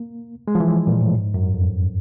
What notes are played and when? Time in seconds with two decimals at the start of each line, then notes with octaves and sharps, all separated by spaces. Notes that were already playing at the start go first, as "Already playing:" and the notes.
Already playing: A#3
0.48 G#3
0.55 F3
0.60 E3
0.87 A#2
1.01 A2
1.15 G#2
1.34 F#2
1.54 F2